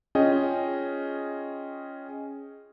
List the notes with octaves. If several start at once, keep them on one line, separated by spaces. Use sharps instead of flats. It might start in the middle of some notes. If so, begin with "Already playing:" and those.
C#4 F4 G#4 D#5 G5